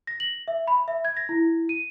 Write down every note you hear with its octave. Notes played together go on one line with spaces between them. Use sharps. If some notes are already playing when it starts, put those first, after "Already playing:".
A#6
F#7
E5
B5
E5
G#6
A#6
E4
D#7